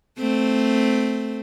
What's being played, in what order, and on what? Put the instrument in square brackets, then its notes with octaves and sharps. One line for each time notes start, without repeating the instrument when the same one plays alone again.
[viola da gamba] A3 C4